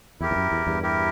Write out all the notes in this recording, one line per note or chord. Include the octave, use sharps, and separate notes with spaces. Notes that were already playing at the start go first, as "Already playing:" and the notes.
E2 E4 G4 A#4
E2
F#2
E2
E2 G2
E4 G4 A#4